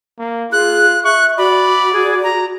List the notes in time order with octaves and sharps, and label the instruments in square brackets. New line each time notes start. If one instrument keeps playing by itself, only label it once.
[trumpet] A#3
[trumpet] F4 [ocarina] G#4 [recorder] F#6
[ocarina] E5 [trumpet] C#6 [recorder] F#6
[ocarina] F#4 [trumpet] D5 [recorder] B5
[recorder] G#4
A#5